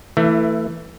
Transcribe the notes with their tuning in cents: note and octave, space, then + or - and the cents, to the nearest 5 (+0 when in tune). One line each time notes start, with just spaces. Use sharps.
E3 +0 A3 +25 E4 +0